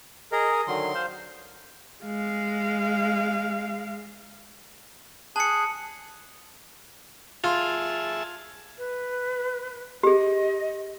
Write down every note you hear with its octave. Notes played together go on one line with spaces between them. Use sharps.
G#4 A#4 D#5
G#5
D3 D#3 F#3 C6
C5 F5
G#3 F5
G#4 A5 F#6 C#7
F4 G#4 E5 A5
B4
G4 G#4 D#5